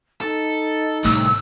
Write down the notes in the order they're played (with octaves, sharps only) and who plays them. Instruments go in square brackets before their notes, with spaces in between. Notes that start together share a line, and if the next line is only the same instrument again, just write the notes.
[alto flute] D#4 [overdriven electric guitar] A4
[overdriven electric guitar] C2 [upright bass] A2 D#3 [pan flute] E6